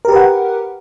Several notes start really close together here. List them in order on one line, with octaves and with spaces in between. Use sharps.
A#4 G4 B4 F#5